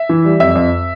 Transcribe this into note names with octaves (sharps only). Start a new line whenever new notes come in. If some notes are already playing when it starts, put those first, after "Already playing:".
Already playing: E5
E3
G3
F2 E5
F2